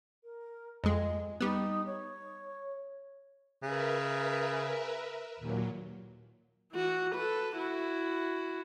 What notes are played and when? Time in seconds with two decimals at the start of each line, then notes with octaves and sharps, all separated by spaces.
0.23 A#4
0.84 F2 G#3 D#5
1.40 G3 B3 D#4
1.86 C#5
3.63 C#3 A#4 B4 E5
5.39 D#2 A#2 F#3
6.71 E3 F#4
7.15 A4 B4
7.56 E4 F#4